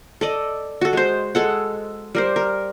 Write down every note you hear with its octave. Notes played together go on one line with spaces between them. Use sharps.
A4 D5 D#5
F#4 A4
G#3 C5
G#3 A4 F#5
G3 A#4 C5
A#4